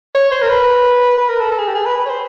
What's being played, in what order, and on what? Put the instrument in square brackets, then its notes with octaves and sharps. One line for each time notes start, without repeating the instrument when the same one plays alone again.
[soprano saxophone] C#5
C5
A#4
B4
B4
A#4
A4
A4
G#4
G4
G#4
B4
B4
C#5
C5